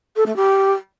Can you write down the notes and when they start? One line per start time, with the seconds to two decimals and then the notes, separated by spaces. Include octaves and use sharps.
0.16 A4
0.26 A3
0.36 G4